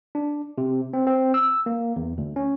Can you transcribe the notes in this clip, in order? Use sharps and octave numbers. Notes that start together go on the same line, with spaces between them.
D4
C3
C4
C4
E6
A#3
E2
D2
C#4